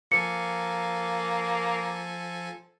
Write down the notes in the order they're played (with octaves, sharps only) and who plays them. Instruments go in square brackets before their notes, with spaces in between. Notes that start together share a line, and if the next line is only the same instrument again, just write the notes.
[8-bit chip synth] F3 A4 G#5 [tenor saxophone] A#3 [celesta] C#7